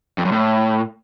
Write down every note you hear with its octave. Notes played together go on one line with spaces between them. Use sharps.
F2
F#2
A2